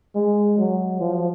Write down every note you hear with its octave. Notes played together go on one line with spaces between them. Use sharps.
G#3
F#3
F3